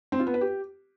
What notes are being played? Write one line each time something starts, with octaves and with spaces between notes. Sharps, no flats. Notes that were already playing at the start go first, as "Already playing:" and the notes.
C4
F4
B3
B4
G4